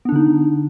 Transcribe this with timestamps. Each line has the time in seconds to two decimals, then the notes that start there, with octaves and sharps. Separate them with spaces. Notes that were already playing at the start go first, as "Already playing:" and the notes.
0.05 B3
0.09 D4
0.12 D3
0.16 D#4